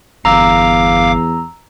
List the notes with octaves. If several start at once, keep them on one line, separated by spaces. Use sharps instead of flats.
G1 E2 F5 A#5 D6 E6